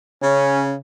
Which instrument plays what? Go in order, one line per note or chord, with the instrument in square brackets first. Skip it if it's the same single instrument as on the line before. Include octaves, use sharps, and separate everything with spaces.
[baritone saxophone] C#3 [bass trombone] C#4